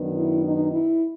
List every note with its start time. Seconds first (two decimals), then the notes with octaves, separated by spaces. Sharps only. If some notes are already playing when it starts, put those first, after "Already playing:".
Already playing: F#2 D#3 F#3 B3 D4
0.13 E4
0.42 D#4
0.70 E4